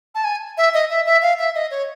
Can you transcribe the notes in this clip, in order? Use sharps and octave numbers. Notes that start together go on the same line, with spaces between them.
A5
G#5
E5
D#5
E5
E5
F5
E5
D#5
C#5